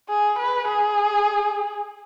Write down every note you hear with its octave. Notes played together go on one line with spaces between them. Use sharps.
G#4
B4
G#4